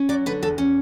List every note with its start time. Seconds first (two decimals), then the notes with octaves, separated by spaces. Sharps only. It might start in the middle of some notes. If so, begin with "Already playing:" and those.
Already playing: C#4
0.09 F#3 D5
0.26 D3 B4
0.42 E2 A4
0.58 C#4